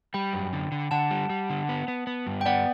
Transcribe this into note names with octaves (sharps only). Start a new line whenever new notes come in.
G3 G5 B5
F#2
D3
D3
D3 F#5 A5
G3
G3
D3
B3
B3
B3
G2
G5
B3 D5 F#5